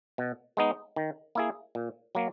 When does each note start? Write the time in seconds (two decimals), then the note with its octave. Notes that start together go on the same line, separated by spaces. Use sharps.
0.18 B2
0.57 G#3 B3 D#4
0.96 D#3
1.35 A#3 E4 G#4
1.75 A#2
2.15 F#3 A#3